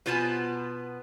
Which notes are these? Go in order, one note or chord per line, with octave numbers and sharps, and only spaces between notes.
B2 B3 F4 C5 G#5 A5